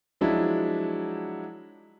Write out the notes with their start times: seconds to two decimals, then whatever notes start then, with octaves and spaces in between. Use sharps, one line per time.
0.21 F3 F#3 G#3 D4 E4